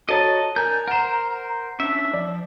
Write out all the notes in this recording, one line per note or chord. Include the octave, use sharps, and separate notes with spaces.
F#4 A4 C#5 D#5 A5 A#5
D4 A#4 G#5 A#5 G6
A#4 C5 F#5 E7
C#4 D4 E5
F3 D5